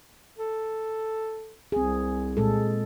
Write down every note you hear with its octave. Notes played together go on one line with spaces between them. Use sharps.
A4
C2 C4 G#4
A#2 G#3 A4